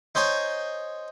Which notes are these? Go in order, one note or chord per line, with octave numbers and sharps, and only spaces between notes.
D#4 C5 C#5 G#5